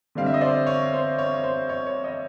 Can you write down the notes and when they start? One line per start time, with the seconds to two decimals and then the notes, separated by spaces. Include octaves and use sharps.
0.15 D3 G3 C4 F5
0.26 E5
0.34 D#5
0.41 C5 D5
0.67 C#5
0.93 C5
1.18 C#5
1.43 C5
1.69 C#5
1.86 C#5
2.04 C#5 D#5